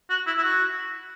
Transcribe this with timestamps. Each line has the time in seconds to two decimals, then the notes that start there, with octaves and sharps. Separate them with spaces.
0.10 F#4
0.27 E4
0.37 E4
0.43 F#4